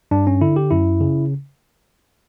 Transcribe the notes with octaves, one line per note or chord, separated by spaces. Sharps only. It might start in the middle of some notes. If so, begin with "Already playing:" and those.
G2 D4
C#4
D3 E4
G4
F#2 E4
C#3